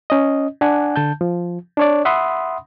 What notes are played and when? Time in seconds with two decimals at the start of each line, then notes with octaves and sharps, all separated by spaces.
0.10 C#4 D#5
0.61 D4 F#5 G#5
0.96 D3 A5 G6
1.21 F3
1.77 D4 C#5 D5
2.05 E5 F#5 B5 C6 D#6